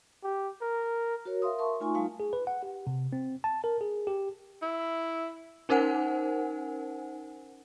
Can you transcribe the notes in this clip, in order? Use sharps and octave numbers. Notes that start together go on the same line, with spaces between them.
G4
A#4
F#4 A#4 C#5
A#4 E5 F5 C6 D#6
A#4 E5 A5 C6 C#6
A3 D#4 F4 G#5 C6 C#6
G3 A3 D#4 F4 F5 A5
G#4
B4
F#5
G4
C3
C4
A5
A#4
G#4
G4
E4
C#4 D#4 A#4 C5 F#5 G#5